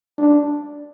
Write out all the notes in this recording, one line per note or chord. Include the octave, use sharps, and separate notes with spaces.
D4